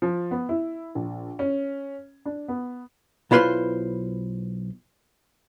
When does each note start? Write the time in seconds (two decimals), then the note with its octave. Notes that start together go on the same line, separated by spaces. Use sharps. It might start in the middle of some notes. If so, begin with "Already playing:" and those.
0.02 F3
0.31 B3
0.49 E4
0.95 A#1
1.39 C#4
2.25 D4
2.48 B3
3.31 B1 E4 F4 B4 C5 C6